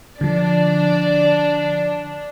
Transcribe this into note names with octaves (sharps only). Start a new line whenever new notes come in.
D3 F3 D4 D5